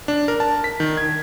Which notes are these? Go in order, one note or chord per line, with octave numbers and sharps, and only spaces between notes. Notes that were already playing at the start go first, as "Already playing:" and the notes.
D4
A#4
A5
B6
D#3
G#6